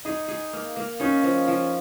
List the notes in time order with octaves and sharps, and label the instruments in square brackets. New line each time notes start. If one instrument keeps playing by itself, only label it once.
[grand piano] D#4 [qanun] G#4
[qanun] G#4
A#3
A#3
[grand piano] C#4 [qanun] D#4
[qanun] F3
F3